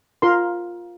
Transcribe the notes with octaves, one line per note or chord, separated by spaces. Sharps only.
F4 A#4 C6